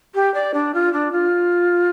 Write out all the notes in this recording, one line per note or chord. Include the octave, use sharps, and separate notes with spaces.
G4
D5
D4
F4
D4
F4